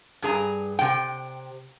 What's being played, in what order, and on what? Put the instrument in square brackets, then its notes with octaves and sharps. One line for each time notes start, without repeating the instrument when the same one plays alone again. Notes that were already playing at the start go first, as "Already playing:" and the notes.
[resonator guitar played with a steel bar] G2 G#4 A#5
C3 G5